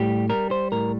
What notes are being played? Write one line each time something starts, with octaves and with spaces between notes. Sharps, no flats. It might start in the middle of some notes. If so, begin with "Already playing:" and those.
Already playing: A2 G3 G4
G3 A#4
C5
A2 A#4